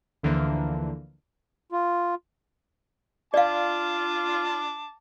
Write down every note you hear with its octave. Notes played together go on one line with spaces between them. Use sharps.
D2 D3 E3 F3 A#3
F4
F4 D5 F5 A5 D6